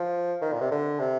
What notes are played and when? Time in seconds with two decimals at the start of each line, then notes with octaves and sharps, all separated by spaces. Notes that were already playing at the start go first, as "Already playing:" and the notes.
Already playing: F3
0.42 D#3
0.53 A#2
0.62 C3
0.71 D3
0.99 C3